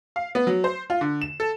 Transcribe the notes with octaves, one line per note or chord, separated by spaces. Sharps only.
F5
B3
F#3
C5
F4
D3
E7
A4